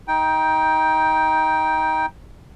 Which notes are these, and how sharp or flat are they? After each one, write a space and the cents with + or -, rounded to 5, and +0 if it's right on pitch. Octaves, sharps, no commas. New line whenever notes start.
D#4 +20 G5 +0